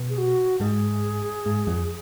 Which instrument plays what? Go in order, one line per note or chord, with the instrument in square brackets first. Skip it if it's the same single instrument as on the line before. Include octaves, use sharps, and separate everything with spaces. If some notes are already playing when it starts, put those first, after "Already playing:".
Already playing: [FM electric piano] B2 B3
[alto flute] G#4
F#4
[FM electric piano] G#2 G#3 [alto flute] G#4
[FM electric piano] G#2 G#3
F2 F3